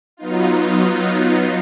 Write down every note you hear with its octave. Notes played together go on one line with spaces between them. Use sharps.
F#3 B3 D#4 F4